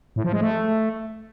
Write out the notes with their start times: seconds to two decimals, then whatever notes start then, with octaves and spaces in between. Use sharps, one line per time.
0.16 A2
0.24 F3
0.33 G#3
0.41 A3